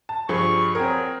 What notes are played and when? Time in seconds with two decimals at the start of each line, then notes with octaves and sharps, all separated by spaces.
0.09 A5
0.29 G2 F3 G#4 C#6
0.75 A#2 F#3 C4 G#4 A#4